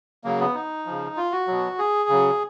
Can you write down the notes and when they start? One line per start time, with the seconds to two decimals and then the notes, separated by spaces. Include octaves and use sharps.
0.24 C#3 F#3 A#3
0.40 B3
0.55 D#4
0.86 C#3 F3
1.17 F4
1.32 F#4
1.47 B2 F#3
1.79 G#4
2.09 C#3 F#3